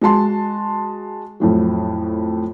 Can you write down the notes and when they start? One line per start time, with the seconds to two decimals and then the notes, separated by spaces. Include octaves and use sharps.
0.01 G#3 F#4 A5 C6
1.40 F2 A2 F#3